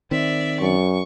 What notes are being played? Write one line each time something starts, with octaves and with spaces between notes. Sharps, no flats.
D#3 C4 D5 E5
F#2 C#6